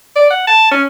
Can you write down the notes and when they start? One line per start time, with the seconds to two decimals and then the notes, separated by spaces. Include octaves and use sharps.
0.16 D5
0.30 F#5
0.47 A5
0.71 C#4